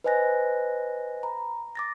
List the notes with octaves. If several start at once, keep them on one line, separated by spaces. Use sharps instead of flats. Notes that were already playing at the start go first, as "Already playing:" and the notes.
B4 C5 D#5 G#5 F#6 A#6
A#5 B5
D6 A6 A#6